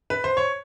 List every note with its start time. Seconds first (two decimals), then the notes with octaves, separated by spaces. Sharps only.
0.10 B4
0.24 C5
0.37 C#5